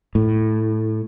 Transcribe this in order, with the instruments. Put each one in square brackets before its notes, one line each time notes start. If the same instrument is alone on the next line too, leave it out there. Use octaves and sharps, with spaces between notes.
[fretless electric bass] A2